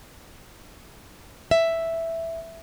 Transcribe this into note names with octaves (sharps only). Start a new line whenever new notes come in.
E5